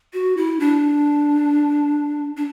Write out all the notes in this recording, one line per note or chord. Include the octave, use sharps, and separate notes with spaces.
F#4
E4
D4
D4